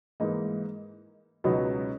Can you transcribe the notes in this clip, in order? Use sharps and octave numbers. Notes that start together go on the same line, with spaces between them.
G#2 E3 A#3 D#4
C#2 B2 F#3 B3 D#4